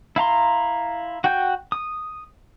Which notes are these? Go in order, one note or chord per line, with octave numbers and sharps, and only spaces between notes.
E4 F5 A#5 C6
F#4 F#5 G5 G6
D#6